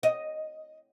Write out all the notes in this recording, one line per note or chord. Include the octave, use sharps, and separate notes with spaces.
D#5